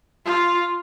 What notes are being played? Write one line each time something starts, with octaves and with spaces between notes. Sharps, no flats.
F4